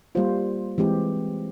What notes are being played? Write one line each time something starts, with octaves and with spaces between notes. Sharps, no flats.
G3 A#3 F4 C5
E3 G#3 C4 G4